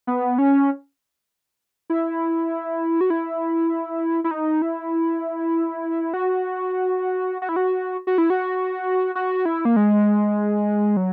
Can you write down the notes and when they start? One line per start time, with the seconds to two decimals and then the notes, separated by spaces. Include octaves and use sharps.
0.07 B3
0.38 C#4
1.90 E4
3.01 F#4
3.10 E4
4.24 E4
4.31 D#4
4.62 E4
6.14 F#4
7.42 F#4
7.49 E4
7.56 F#4
8.07 F#4
8.18 E4
8.30 F#4
9.15 F#4
9.45 E4
9.65 A#3
9.76 G#3
10.97 F#3